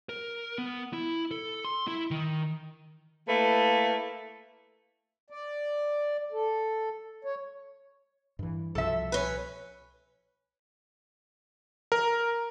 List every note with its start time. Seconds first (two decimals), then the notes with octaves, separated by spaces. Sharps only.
0.09 A#4
0.58 B3
0.93 E4
1.31 A4
1.64 C6
1.88 E4
2.11 D#3
3.27 A3 A#3 E4 B4
5.30 D5
6.32 A4
7.24 C#5
8.39 G2 E3
8.75 C2 B2 F3 A4 E5
9.12 C#4 B4
11.92 A#4